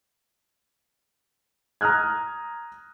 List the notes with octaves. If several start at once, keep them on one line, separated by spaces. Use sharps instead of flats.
A#5 D#6 F6 F#6 G#6